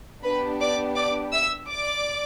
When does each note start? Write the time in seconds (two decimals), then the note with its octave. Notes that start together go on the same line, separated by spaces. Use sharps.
0.24 B3 D4 G4 B4 B5
0.60 D5 D6
0.96 D5 D6
1.33 E5 E6
1.69 D5 D6